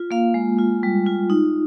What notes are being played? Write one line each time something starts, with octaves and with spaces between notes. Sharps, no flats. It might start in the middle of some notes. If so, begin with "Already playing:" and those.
Already playing: F4
A#3 F5
G#3
F4
G3
F4
D#4